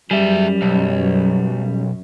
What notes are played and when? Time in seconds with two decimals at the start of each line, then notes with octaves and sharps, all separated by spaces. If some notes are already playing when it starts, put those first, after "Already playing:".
0.11 F#2 G3 G#4 E5
0.62 B1